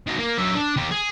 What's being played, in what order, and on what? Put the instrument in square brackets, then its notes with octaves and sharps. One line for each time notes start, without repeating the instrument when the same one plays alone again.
[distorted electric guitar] D#3 F#4
A#3
F#3 E5
D4
D#3 G4
G#4